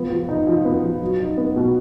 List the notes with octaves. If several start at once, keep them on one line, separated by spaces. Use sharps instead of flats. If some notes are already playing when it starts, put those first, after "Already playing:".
Already playing: F3 B3
F3
D#4
F3
B3
F3
F#3
D#4
B3
B2